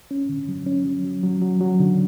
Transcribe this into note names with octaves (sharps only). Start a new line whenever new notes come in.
C#4
D3
F#3
C#4
F#3
F#3
F#3
F#3
F#3
D3